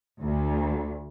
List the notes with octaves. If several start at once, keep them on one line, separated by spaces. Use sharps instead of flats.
D2